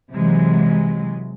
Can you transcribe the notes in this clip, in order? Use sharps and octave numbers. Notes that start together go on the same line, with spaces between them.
C3 E3 F#3 G#3